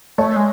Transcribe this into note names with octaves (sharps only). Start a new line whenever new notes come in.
A3 C#5
G#3